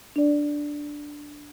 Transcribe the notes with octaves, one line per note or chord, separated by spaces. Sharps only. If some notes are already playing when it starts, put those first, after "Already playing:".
D4 D5